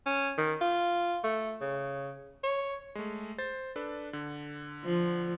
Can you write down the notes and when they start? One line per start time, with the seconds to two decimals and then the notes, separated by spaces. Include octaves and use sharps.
0.06 C#4
0.37 D#3
0.61 F4
1.24 A3
1.61 C#3
2.43 C#5
2.95 G#3 A3
3.38 C5 A6
3.76 D4 A4 B4
4.13 D3
4.84 F3